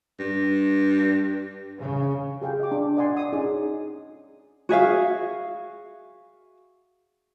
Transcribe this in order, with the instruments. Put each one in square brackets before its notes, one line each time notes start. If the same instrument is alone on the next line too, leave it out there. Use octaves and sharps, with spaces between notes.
[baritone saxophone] G2
[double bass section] C#3
[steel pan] G4 G#4 F5 G5
D#5 D6
D4
D5 D#5 F#5 G#5 C6
D#6
C#4 D#4 G#4
[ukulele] F#4 G#4 E5 F5